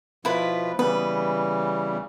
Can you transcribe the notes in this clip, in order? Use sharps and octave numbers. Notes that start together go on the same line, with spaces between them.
B2 F3 E4 F4 B4
C#3 E3 G3 B3 B4